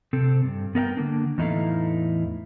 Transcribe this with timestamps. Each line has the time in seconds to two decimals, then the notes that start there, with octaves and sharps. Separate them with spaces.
0.13 C3 C4 A4
0.44 G2
0.75 B3 A#4 F5 G5
0.96 D3 A#3 D4
1.38 E2 A2 D#4 E4 A4 F5